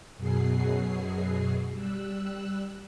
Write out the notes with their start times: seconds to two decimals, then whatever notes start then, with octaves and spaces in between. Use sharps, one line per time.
0.17 F#2 B2 F#3 G#4 C7
1.72 G3 E6 F#6